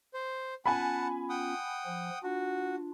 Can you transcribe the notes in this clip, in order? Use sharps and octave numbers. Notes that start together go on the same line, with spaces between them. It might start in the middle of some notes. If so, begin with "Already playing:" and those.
C5
B3 C#4 F4 F#5 G#5 A5 B5
F#5 G5 D#6
F3
D4 F4 F#4